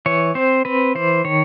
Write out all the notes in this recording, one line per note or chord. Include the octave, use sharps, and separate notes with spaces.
E3 C#5
C4 C5
C4 B4
E3 C5
D#3 C#5